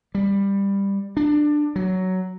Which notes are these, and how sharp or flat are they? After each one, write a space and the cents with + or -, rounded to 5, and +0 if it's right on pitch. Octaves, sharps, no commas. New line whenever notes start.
G3 +15
D4 +15
F#3 +10